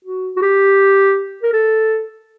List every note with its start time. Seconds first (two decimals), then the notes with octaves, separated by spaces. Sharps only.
0.05 F#4
0.36 F#4
0.42 G4
1.43 A#4
1.53 A4